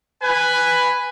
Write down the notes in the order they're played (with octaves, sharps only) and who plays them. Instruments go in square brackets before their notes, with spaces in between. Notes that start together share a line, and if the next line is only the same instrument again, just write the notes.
[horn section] B4 G#5